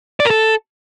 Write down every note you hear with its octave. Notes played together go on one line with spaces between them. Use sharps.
D5
A#4
A4